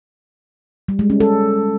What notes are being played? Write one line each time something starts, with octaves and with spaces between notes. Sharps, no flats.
G3
G#3
C#4
A4